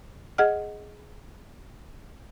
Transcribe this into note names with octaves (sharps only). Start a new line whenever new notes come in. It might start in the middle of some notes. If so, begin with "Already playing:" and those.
G#4 D#5 F#5 F6